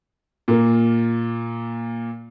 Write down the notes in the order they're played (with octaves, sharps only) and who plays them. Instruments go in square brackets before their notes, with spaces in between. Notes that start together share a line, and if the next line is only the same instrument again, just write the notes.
[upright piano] A#2 A#3